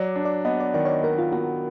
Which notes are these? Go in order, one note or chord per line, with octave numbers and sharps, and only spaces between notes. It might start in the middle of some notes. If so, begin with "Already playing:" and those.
Already playing: F#3 D5
D4
D5
B3 D#5
D5
D#3 D5
C#5
D5
B3 A#4
F4
B3 F#4